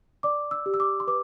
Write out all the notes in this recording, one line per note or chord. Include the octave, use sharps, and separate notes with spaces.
D5 D6
E6
G4
E6
D6
C6
B4 D6